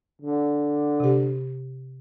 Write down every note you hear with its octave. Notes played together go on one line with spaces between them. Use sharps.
D3
C3 G4